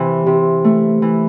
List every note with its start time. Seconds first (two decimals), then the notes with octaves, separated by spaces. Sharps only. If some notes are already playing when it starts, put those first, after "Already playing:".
Already playing: C3 E3
0.26 C3
0.64 A3
1.02 E3